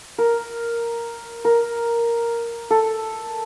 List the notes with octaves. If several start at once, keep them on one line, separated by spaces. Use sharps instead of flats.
A#4
A#4
A4